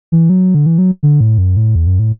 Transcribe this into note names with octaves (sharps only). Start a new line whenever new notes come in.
E3
F#3
D3
E3
F#3
D3
A2
F#2
A2
E2
F#2
A2